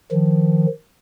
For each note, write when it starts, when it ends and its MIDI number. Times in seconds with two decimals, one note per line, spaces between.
0.12 0.66 51
0.12 0.66 53